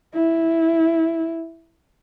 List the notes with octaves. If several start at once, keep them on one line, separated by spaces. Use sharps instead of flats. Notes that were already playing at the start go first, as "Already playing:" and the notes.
E4